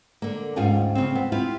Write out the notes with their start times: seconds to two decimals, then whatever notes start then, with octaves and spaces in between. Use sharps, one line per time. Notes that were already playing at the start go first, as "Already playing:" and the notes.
0.22 D3 A#3
0.56 D2 G#2 C#4 F4 G#4 G5
0.95 C#3 C4
1.15 B3
1.32 E4 F4 G4